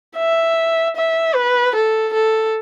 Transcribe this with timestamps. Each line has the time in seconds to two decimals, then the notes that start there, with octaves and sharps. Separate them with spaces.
0.17 E5
0.96 E5
1.35 B4
1.75 A4
2.13 A4